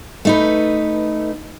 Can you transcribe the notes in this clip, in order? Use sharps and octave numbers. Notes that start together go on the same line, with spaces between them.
A3 D#4 B4